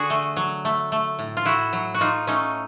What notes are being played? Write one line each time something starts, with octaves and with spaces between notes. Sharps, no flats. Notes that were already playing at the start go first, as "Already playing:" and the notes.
Already playing: D3 F#4 G#4
A3
F#3
A3
A3
A2
F4
A2 E4 F#4
F#3
F#4
A2 D#4 F4
A3 C#4 D#4